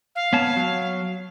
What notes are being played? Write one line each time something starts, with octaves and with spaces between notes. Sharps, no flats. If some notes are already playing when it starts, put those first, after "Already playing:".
F5
B3 C#5 A5
F#3